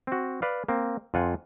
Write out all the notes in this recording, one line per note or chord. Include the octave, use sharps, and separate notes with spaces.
C4 F#4
B4 D5 F5
A#3 C4
F2 F4 F#5 G#5